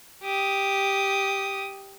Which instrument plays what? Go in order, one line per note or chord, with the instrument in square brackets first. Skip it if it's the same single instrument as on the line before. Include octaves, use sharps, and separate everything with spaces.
[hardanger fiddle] G4 D#6